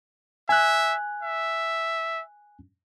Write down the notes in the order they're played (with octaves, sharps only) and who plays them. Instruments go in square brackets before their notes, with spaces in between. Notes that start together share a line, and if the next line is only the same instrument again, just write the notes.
[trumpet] E5 [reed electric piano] G#5 F#6
[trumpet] E5